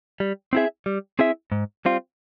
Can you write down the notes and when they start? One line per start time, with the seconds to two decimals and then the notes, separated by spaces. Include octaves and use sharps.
0.20 G3
0.53 C4 E4 G#4 E5
0.86 G3
1.19 C4 E4 G#4 E5
1.52 G#2
1.85 G3 C4 F4